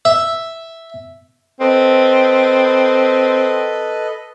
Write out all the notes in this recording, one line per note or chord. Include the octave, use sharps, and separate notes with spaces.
E5
C4 A4 B4 D#5